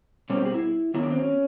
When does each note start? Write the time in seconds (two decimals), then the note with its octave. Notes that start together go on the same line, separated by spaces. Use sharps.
0.30 B2 G3 C4 C#4
0.37 G4
0.45 G#4
0.54 E4
0.94 D#3 F#3 B3 E4
1.03 D4
1.10 C4
1.19 C#4